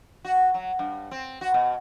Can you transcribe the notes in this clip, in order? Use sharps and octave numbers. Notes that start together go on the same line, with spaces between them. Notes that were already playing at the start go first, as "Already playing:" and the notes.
F#4
F#3
G2
C4
F#4
B2